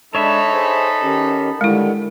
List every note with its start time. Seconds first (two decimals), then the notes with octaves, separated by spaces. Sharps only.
0.15 G#3 D4 D#4 A4 C#5 E5 B5
0.53 G#4 C5
1.03 D#3 C#4 G4
1.61 D3 D#3 G3 G#3 E4